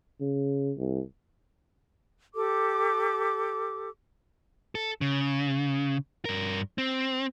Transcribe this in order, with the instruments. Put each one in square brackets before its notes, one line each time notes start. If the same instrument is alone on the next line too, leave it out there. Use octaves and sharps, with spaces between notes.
[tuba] C#3
C2
[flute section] G4 A4 D6
[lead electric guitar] A4
C#3
G2 A#4
C4